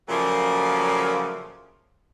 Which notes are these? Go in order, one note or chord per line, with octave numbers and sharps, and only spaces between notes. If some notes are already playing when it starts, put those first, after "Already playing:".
A#2 C#3 F3 F#3 A3 A#3